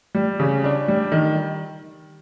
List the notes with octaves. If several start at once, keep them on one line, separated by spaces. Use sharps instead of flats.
G3
C#3
D4
G3
D#3